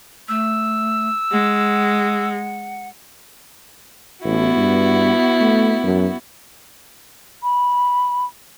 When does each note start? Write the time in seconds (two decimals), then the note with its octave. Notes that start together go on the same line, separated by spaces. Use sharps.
0.29 A3 E6
1.31 G#3 F#5
4.24 A1 B3 E4 F#4
4.56 G2
5.41 A3
5.84 F#2
7.43 B5